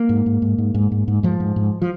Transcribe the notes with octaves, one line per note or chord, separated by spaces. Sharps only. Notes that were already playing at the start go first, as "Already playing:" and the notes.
Already playing: A#3
G#2
G#2
G#2
G#2
G#2
G#2
G#2
G#2 F3
G#2
G#2
F3